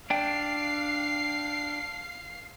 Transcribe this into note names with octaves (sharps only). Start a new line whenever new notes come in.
D4 F5 G5 C7